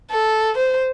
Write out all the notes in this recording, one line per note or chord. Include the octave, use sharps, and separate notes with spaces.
A4
C5